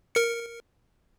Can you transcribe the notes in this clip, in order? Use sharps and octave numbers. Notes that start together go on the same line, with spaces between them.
A#4 C#7